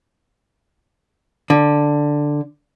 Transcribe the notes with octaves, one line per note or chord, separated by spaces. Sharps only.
D3